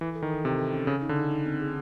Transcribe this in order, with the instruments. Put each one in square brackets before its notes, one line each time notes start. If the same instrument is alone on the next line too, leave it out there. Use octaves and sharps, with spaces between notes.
[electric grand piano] E3 [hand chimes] A4
[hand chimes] A4
[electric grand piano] D#3
[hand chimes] A4
[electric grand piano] C3 [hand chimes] A4
[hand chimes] A4
C#4
[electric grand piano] C#3 [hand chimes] G#4
[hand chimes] D#4
[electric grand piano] D3
[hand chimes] D#4
D#4
C4
G#4